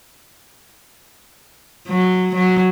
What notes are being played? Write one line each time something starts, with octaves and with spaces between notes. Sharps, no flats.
F#3
F#3